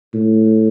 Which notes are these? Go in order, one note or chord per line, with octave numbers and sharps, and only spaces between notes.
A2